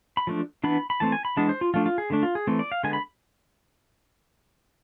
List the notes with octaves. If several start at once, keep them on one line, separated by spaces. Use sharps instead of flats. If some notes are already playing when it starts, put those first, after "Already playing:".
B5
F3 A3 D4
E3 B3 D4 B5
B5
E3 A3 C4 A5
G#5
B5
E3 G#3 B3 D4 A5
C5
F4
F3 A3 D4 F4
F4
G#4
D3 A3 D4
F4
G#4
E3 A3 C4
D5
F5
D3 G#3 B3 G#5
B5